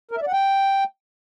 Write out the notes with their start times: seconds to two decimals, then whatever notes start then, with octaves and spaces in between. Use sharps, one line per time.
0.11 A#4
0.17 E5
0.22 D5
0.27 F#5
0.33 G5